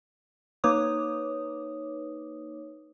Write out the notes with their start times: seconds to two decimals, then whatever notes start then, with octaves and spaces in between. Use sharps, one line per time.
0.64 A#3 D#4 B4 C#5 D6 D#6